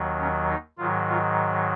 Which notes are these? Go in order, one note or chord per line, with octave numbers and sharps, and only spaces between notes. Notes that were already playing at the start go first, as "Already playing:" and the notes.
Already playing: D#2 D#3 F#3
C#4
D#4
G#2 D#3 F#3 F4
F4